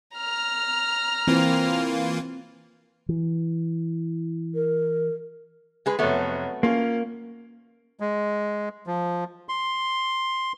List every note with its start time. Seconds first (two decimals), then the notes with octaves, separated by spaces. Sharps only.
0.16 A#5 F6
1.27 E3 A#3 C4 F4
3.09 E3
4.54 A#4
5.86 G#3 G#4 B4
5.99 F1 F#3 A3 B3 C#5
6.63 A#3 C#4 F4
8.00 G#3
8.87 F3
9.49 C6